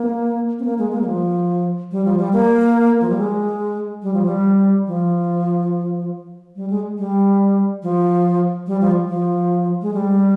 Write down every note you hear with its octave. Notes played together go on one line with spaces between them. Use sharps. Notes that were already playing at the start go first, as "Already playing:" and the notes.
Already playing: A#3
C4
A#3
G#3
A#3
G3
F3
G3
F3
G3
A#3
F3
G3
G#3
G3
F3
G3
F3
G3
G#3
G3
F3
G3
F3
F3
G#3
G3